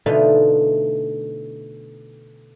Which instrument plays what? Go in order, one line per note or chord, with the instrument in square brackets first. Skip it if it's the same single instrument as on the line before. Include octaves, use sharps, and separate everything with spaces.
[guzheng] B2 D3 E3 A3 D#4 F4